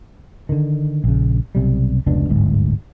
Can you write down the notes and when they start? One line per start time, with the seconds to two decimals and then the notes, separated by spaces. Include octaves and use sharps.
0.49 D3 D#3
1.04 A#1 C#3
1.55 B1 C3 G3
2.06 F1 C#2 B2 D4
2.29 D1 G1 G#2